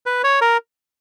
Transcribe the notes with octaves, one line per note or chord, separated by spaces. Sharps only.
B4
C#5
A#4